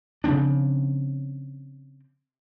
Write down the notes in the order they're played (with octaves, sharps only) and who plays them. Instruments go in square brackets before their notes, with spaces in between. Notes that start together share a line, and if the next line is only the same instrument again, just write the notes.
[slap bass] C#3 F3 C4 D4